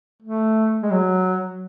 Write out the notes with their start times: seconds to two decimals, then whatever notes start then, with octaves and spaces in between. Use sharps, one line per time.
0.23 A3
0.83 G#3
0.91 F#3